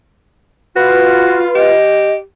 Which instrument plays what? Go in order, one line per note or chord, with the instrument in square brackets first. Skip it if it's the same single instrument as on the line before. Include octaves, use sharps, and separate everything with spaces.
[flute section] F4 [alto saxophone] F#4 [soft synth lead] B4
[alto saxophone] G4 [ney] D#5